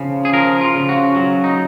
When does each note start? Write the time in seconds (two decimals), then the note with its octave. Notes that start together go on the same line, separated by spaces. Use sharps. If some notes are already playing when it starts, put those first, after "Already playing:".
Already playing: C#3 F3
0.25 G#4
0.33 F3 A#4
0.61 F4
0.75 C#3
0.89 F#4
1.16 F#3
1.44 D#4